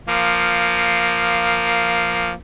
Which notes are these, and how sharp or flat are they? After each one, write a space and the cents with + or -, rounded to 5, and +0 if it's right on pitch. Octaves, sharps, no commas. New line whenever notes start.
F3 -5 A#3 +0